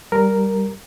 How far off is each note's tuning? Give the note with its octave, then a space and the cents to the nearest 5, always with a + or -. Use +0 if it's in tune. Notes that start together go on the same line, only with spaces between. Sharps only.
G3 -10 A#4 +0